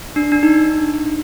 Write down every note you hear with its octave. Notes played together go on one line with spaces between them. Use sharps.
D4
D4
D#4